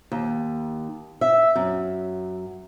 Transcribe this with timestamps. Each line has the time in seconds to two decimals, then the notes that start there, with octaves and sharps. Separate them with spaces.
0.12 D#2
1.21 E5
1.56 F#2